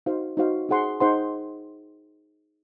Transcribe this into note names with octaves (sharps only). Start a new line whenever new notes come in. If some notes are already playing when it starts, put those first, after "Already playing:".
D#4 F#4 C5 F5
D#4 F#4 C5 F5
D#4 G#4 C5 F#5 C6
D#4 G#4 C5 F#5 C6